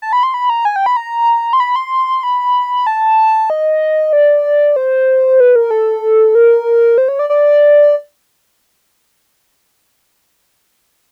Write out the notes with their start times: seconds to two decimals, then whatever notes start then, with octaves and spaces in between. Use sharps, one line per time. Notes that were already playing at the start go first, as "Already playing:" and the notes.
0.02 A5
0.13 B5
0.23 C6
0.34 B5
0.50 A#5
0.65 G#5
0.76 G5
0.86 B5
0.97 A#5
1.53 C6
1.60 B5
1.76 C6
2.23 B5
2.87 A5
3.50 D#5
4.13 D5
4.76 C5
5.40 B4
5.56 A#4
5.71 A4
6.35 A#4
6.98 C5
7.08 C#5
7.19 D5
7.30 D5